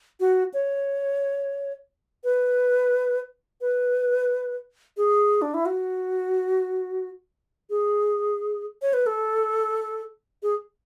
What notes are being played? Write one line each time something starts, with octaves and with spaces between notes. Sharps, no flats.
F#4
C#5
B4
B4
G#4
D4
E4
F#4
G#4
C#5
B4
A4
G#4